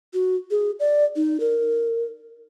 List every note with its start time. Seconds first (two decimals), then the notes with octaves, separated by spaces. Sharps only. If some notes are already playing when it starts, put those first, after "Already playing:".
0.14 F#4
0.51 G#4
0.80 D5
1.16 D#4
1.40 A#4